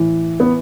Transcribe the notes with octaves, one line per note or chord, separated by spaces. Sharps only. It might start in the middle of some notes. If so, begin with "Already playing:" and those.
Already playing: A2 E3
B3